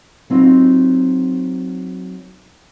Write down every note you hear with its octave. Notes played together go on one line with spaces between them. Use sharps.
F#3 C4 D#4 F4